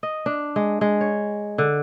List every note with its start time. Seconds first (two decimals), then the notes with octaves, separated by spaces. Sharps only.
0.03 D#5
0.26 D4
0.56 G#3
0.81 G#3
1.01 C#5
1.58 D3